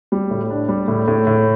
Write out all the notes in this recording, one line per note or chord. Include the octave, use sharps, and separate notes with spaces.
G3
A2
D4
G3
A2
A2
A2